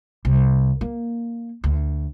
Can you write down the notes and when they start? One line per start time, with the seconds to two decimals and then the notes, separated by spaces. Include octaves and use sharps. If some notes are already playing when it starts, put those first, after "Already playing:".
0.25 C2
0.81 A#3
1.64 D2